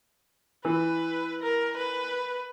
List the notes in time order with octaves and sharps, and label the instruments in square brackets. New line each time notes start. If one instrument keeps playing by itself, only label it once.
[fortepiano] E3 [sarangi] B4
[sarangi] A#4
B4